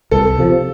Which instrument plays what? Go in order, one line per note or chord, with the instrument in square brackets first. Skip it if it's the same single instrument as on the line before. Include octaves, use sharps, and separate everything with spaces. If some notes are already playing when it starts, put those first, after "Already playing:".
[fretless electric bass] C2 [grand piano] A4
[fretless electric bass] C3 F3